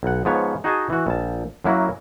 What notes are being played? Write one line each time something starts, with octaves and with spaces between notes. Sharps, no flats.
B1 F#5
G#2 F3 B3 C#5
D#4 F#4 G#4 D#5 G#5 A5
E3 F#4
A#1 A5
F#2 F#3 A#3 E4 F#4